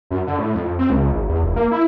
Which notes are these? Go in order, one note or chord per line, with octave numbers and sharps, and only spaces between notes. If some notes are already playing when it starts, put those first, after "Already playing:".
F#2
D3
A2
F2
C4
C#2
G#1
E2
F1
A#3
E4